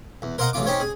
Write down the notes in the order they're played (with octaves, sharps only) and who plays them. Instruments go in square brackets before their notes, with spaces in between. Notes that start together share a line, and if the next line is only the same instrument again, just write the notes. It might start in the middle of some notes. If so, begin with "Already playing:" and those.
[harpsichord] E2
A#4 C5 D#5 F5 F#5 A#5
A1 C#3 F4 D6
C#4 D#4 G4 C5 C#5
G#4